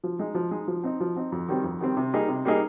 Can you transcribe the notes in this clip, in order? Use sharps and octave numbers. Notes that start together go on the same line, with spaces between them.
F3
G#3 D#4 G#4
F3
G#3 D#4 G#4
F3
C4 D#4
F3
C4 D#4
F2
D#3 G3 C4
F2
D#3 G3 C4
C3
G3 A#3 D#4 G#4
C3
G3 A#3 D#4 G#4